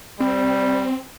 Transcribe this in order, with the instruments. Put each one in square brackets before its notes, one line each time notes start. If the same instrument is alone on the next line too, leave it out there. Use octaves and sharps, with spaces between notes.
[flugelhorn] G3 [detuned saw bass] C4